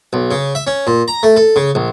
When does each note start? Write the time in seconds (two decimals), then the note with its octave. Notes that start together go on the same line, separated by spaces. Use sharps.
0.13 B1
0.31 C#3
0.55 E5
0.67 C#4
0.87 A#2
1.08 A#5
1.23 A3
1.36 A4
1.56 C#3
1.75 A#1